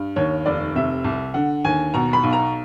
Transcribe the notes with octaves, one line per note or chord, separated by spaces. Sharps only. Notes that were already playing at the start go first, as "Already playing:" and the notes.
Already playing: G2
D#2 C#5
F1 D5
C3 E5
C2
D3 F#5
D#2 G#5
B2 A#5
B5
B1
A#5